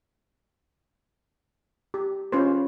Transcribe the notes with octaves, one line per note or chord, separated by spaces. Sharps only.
G4
C#4 F4 B4 C5